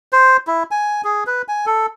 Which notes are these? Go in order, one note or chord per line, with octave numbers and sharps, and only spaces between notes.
C5
E4
G#5
G#4
B4
G#5
A4